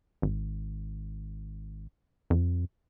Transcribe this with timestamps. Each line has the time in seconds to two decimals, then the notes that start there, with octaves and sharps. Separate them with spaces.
0.22 G#1
2.30 F2